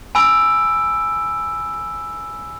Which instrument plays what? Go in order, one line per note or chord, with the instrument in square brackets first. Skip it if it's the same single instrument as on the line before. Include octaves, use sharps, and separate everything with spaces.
[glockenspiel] G#5 B5 E6 D7